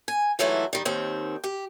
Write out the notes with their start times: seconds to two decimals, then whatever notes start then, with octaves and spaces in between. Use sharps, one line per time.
0.08 G#5
0.39 G#2 E3 F#3 A3 E4 F4
0.73 D#3 G3
0.85 D#2 D#3 C4 C#5
1.44 G4